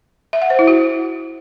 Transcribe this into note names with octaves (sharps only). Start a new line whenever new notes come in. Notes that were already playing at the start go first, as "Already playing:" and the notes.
E5
F#5
C5
E4
F#4